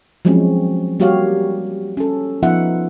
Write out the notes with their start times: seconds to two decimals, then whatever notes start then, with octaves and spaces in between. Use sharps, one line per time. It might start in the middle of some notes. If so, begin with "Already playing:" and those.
0.25 F3 F#3 G#3 C4 C#4
1.00 G3 A#3 F#4 G4 C#5 F5
1.97 C#4 A4
2.43 F3 B3 D#4 F4 E5 F#5